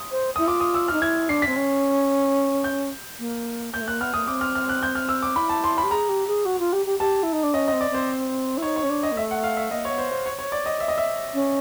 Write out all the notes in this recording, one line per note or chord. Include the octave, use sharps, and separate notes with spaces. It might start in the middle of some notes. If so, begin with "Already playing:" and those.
Already playing: D#6
C5
E4 D#6
F4 D6
D#6
E6
F6
D#4
E4 G#6
D4 C7
C4 B6
C#4
G6
A#3
A#3 G6
A3
A#3 F#6
B3 F6
A#3 D#6
C4 D6
F6
F6
F#6
G6
F6
E6
D6
E4 B5
A5
C6
B5
G4
G#4 A#5
G4
G#4
F#4
F4
G4
G4
G4 A5
E4
D#4
D4
C#4 D#5
D#5
C4
D5
C4 C5
E4
D#4 C#5
C#5
C#4
D4
D#5
A#3
A3 E5
F#5
F5
E5
A#3 D#5
C#5
B3
C5
C5
C#5
C#5
D5
D#5
E5
D#5
E5
C#4